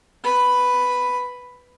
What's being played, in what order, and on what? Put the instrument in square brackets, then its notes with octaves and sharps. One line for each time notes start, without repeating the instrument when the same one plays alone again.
[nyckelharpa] B4 B5